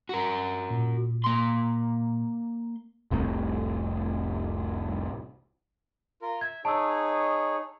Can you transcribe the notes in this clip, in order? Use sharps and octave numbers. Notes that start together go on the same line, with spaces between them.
F#4 A#4
A#2
A#3 C6
F1 C2 A2 C3
F4 A#4
E5 G#6
D#4 G#4 C#5 A5 E6